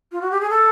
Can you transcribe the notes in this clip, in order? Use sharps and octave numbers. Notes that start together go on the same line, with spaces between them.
F4
F#4
G4
G#4
A4